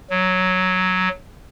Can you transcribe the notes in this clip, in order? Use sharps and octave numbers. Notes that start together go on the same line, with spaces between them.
F#3